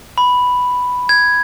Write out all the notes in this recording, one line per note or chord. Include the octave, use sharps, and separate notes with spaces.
B5
G#6